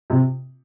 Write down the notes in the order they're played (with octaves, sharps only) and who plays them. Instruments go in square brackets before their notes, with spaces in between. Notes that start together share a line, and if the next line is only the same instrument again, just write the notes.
[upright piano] C3